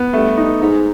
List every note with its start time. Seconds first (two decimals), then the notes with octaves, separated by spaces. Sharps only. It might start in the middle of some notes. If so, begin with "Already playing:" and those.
Already playing: B3
0.13 G2 A3
0.37 D#4
0.60 G#2 D#4